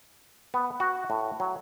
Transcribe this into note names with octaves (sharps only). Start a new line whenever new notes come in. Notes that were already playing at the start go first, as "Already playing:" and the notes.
B3
F#4
A2
F#3